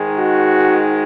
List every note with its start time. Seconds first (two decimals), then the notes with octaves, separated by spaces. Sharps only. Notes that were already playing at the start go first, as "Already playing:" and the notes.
Already playing: G#2 D#3 G#3
0.18 F#4